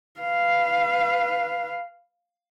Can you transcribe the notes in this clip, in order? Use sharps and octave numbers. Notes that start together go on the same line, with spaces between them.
B4 F5